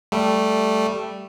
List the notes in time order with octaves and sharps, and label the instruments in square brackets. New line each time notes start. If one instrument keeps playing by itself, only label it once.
[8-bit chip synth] G3 A3